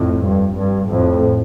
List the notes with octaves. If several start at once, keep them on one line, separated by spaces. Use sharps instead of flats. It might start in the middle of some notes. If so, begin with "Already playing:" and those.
Already playing: F2 A2
G2
G2
F2 A2